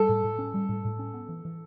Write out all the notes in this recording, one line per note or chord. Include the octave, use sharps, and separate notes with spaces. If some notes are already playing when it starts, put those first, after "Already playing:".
Already playing: G3 A4
A2
A2
C#4
G3
A2
A2
C#4
B3
E3
E3